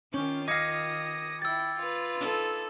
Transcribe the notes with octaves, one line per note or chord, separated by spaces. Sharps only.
D#3 C#4 F4 D6 G6
D#5 F5 D6 D#6 G#6 A#6 C#7
E4 G5 E6 A6
F4 B4
D#4 A4